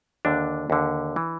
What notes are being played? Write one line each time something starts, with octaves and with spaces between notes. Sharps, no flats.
D#2 D3 D4
D#2 D3
E3